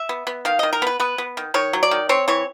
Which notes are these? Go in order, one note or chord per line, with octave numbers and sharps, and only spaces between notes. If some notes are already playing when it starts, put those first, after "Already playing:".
Already playing: E5
B3
B3
D#3 F5
D#3 D#5
A#4
B3 B4
B3 B4
B3
D#3
D#3 C#5
F#3
D5
D#3
C4 C#5
E3 C#5